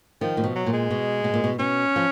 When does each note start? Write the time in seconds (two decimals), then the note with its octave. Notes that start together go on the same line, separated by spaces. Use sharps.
0.21 D#3 F3
0.37 A#2 F3
0.44 B2
0.55 F#3
0.67 A#2
0.73 G#3
0.91 B2
1.24 B2
1.34 A#2
1.44 B2
1.59 B2 C#4
1.96 F3